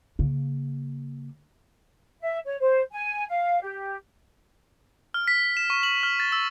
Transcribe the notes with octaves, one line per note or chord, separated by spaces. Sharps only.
C#3 A#3
E5
C#5
C5
G#5
F5
G4
F6
B6
E7
C#6
F#7
F6
A6
E6